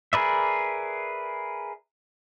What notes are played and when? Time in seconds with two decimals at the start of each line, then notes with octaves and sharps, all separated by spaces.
0.13 G#4 A#4 B4 D5 E5